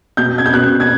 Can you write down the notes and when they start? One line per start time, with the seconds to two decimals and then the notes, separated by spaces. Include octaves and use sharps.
0.17 B2 G6
0.38 G#6
0.46 G6
0.53 B2 F#6
0.80 G#6